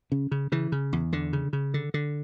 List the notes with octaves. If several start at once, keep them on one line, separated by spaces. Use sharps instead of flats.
C#3
C#3
C#3 E3
C#3
E2
E2 D3
C#3
C#3
D3
D3